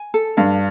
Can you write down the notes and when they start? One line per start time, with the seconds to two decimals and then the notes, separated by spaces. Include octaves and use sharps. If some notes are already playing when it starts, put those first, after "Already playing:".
Already playing: G#5
0.14 A4
0.37 G2 F5